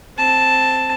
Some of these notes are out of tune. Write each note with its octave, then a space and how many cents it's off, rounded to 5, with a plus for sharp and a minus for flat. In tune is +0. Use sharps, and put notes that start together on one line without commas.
C4 +0 A5 +0